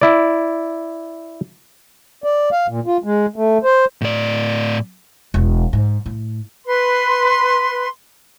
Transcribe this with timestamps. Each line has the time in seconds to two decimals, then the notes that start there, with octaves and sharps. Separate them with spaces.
0.01 E4 D5
2.24 D5
2.52 F5
2.68 A#2
2.86 F4
3.04 G#3
3.36 A3
3.64 C5
4.01 A2 D5
5.34 E1
5.73 G#2
6.06 A2
6.66 B4 C6